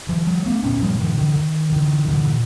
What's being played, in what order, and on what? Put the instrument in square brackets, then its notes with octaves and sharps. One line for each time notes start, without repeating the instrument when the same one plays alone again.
[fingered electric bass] E3 F#3
F3 G3
A3 B3
A#2 B3 C#4
F3 G3
D#3 F3
D3 E3
D#3
D3 E3
A#2 D3 E3